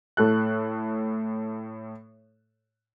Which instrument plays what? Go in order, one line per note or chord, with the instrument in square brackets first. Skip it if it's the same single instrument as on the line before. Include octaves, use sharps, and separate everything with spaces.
[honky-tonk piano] A2 A4 F#6